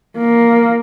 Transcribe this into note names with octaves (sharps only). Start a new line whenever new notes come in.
A#3